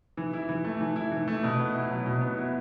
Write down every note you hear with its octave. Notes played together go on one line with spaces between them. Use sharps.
E3
E4
E3
A3
E3
E4
E3
A3
B2
B3
E4
F#3
B2
B3
E4